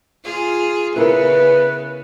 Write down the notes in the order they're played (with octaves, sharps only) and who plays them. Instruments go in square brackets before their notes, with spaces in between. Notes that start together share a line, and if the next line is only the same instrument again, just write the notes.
[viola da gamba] F4 G#4
[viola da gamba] C#3 B3 [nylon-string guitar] E4 A#4 [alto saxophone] B4